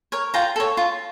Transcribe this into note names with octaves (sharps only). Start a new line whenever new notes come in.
A#4 C#5
F4 G5 A#5
A4 C#5
F4